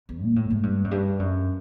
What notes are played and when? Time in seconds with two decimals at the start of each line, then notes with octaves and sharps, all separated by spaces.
0.09 E2
0.23 A#2
0.36 A2
0.50 G#2
0.63 G2
0.84 F#2
0.91 G2
1.19 F#2